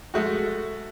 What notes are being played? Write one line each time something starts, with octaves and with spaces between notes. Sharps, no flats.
G#3 A3 F#4